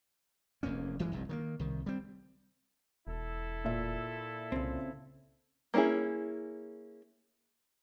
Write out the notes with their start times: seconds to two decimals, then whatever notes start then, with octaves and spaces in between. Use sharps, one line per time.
0.63 F1 E2 A#3 C#4
0.99 G1 E3 F#3 G#3
1.12 F1 C2 G2
1.29 D#3 F3 A#3
1.59 C2 D#3
1.86 G3 C4
3.07 E1 E4 A4
3.65 A#2 E5
4.52 C2 C#3 C4
5.74 A#3 C#4 D#4 E4 G#4